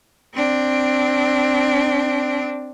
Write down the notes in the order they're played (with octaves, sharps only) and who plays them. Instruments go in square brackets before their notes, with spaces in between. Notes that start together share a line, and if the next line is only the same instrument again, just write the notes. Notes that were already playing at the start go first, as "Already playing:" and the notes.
[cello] C4 D4